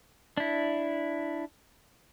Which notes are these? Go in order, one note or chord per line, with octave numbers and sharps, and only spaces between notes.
D4 E4